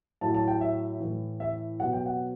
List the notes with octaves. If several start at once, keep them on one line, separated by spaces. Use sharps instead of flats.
A2 F#3 A5
A5
G5
E5
A2 E3
E5
B2 F#3 F#5
G5
F#5